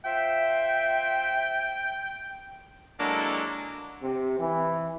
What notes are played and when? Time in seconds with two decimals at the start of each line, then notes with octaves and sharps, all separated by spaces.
0.05 F4 C5 E5 G5
3.00 F#3 G#3 A#3 D4 E4 A4
4.03 C3
4.39 E3